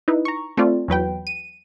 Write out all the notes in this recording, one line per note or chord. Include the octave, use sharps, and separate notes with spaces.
D#4 E4 B4
A#5 C#6
A3 C4 F4 D5
E2 F#3 B4 G5
D#7